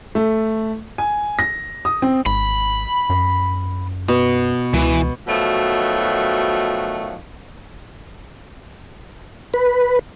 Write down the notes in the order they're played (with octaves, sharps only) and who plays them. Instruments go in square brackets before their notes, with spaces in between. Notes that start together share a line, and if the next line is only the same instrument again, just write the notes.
[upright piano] A3
G#5
A#6
D#6
C4
[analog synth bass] G#1 [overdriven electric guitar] B5
[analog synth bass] F#2
[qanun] B2
[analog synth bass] C#2 [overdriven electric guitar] E3
[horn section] B2 D#3 F3 F#3 A3
[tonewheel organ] B4